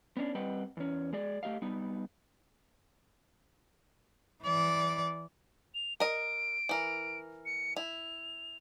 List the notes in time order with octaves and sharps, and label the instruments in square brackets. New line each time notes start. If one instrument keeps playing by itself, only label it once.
[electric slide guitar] B3 C#4 D4
G3 C4 B4 D#5 F#5 G5
E2 C#4
G#3 G#4 D5
A3 G4 D#5 F5
G3 B3 D#4
[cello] E3 D5
[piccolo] F7
[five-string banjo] A#4 D#5 [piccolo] D7
[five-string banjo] E3 A#4
[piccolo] C#7
[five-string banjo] E4 [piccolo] F7